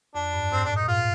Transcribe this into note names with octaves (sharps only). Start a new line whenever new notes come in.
F2 D4
G2
G#2 C4
A#2 D4
D#4
A#2
G#2 F4